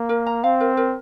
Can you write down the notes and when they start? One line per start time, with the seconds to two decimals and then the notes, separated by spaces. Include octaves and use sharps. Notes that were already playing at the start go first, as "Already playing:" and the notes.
Already playing: A#3
0.09 A#4
0.26 A#5
0.44 C4 F5
0.60 A#4
0.77 A#4